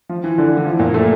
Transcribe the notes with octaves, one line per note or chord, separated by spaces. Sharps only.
F3
E3
D3
E3
E3
F3
A#2
A3